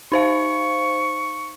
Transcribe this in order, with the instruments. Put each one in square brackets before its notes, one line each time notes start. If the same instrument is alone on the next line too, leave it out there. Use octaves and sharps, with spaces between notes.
[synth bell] D#4 C5 F5 [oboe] C#6